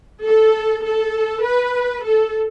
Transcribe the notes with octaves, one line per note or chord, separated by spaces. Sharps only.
A4
A4
B4
A4